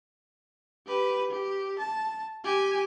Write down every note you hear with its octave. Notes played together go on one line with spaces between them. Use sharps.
G4 B4
G4
A5
G4 G#5